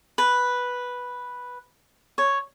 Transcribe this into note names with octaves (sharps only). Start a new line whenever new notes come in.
B4
C#5